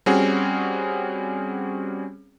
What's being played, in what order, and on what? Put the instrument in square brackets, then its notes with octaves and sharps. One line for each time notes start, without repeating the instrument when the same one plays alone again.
[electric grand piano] G3 C4 C#4 F#4 G#4